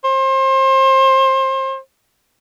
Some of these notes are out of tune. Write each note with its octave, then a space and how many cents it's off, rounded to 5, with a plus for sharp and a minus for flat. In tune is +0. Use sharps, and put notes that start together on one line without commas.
C5 +30